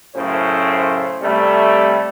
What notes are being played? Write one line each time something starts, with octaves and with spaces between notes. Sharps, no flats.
F#2 A2 C#3 C5
C3 G3 A3